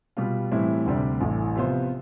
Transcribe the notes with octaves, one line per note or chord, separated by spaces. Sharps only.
B2 G3 B3 F4
A2 E3 G3 C4 E4
D2 C3 G3 D4
A1 A2 E3 A3
C3 F3 B3 F4 C5